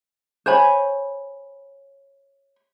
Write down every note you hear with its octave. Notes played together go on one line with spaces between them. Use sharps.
C5 C#5 G#5 B5